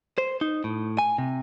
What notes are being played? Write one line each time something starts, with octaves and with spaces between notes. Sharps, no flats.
C5
D#4
A2
G#5
C3